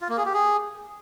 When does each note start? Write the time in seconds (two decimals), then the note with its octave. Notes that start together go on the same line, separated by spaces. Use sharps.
0.01 F4
0.09 A#3
0.17 G#4
0.26 G4
0.34 G#4